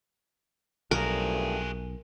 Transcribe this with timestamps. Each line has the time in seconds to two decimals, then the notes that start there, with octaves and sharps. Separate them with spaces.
0.91 B1 G2 F3 A3 F#4 G#4 A#4